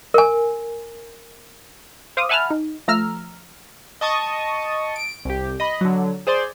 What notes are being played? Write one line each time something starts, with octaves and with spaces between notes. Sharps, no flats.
A#4 G#5
C5 F5 D6 D#6
E5 F#5 G#5 A5 B5 F6
D#4
F3 A3 A#5 E6 F6
D#5 A5 C#6 D#6
D7
C2 G4
D#5 B5
D3 F#3
G#4 C5 D5 C6